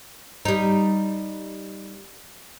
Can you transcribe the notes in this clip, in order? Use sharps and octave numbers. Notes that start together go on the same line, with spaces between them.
G3 D#4